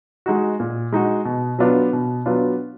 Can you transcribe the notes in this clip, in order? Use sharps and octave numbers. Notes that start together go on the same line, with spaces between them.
G#3 D#4 F#4
A#2
G#3 D#4 F#4
B2
F#3 B3 D4 F4
B2
F#3 B3 D4 F4